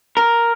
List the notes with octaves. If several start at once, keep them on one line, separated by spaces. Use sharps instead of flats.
A#4